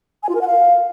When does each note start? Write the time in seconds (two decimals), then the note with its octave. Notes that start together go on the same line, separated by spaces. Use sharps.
0.23 G#5
0.29 F4
0.35 A#4
0.41 F#5
0.47 F5